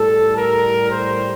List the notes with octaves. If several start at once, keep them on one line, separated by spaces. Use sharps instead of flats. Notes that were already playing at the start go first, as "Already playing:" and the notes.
Already playing: A2 G3 A4
A#4
C5